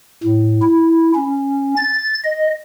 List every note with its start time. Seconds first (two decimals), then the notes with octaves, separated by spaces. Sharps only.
0.24 A2
0.62 E4
1.15 C#4
1.76 A6
2.24 D#5